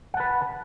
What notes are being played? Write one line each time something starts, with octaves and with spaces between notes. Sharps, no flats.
B4 F#5 A5